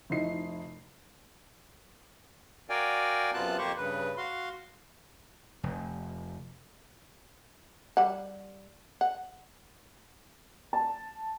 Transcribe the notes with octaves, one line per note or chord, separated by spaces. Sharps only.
F1 D#4 E4 C7
F#4 A#4 D5 F5 G5 G#5
F#2 C3 B3 F4 A5 F#6
F2 A#3 G4 C5 C#6
G2 C#3 B4
F#4 F5 C6
F1
G3 F#5
F#5
A5